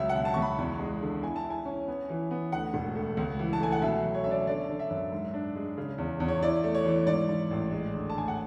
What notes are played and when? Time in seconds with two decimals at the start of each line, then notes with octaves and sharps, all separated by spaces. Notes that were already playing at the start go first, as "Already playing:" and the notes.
Already playing: C#2 F#3 E5
0.09 F#5
0.15 B2
0.25 A5
0.34 C#6
0.37 C#2
0.42 B5
0.58 E2
0.79 G#3
1.01 D3
1.22 E4 G#5
1.36 A5
1.44 E4
1.50 G#5
1.65 C#4
1.88 B3
2.10 E3
2.31 B3
2.52 D2 F#5
2.74 E1
2.96 A3
3.17 C#2
3.39 E3
3.53 A5
3.60 A3 G#5
3.72 F#5
3.82 B2 E5
4.04 F#3
4.14 C#5
4.24 C#4 E5
4.31 D5
4.47 D3 D5
4.69 D3
4.79 E5
4.90 F#2
5.12 G#2
5.34 D4
5.56 G#3
5.78 C#3
5.98 E2
6.20 E2
6.28 C#5
6.42 E4 D5
6.64 A3
6.75 C#5
6.85 E3
7.07 G#2 D5
7.29 G#2
7.51 A1
7.71 G#3
7.93 D2
8.10 A5
8.15 D2 G#5
8.28 F#5